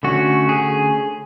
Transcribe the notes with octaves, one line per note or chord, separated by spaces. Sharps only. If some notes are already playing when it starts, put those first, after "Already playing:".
D3 A3 C#4 F#4
G#4